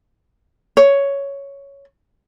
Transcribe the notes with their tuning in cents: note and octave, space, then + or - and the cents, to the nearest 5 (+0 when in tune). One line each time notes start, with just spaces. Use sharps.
C#5 +5